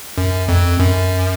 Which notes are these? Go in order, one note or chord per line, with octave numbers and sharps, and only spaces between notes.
F#2
F2
F#2